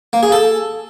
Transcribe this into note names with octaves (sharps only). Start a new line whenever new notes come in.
A#3
G#4
A4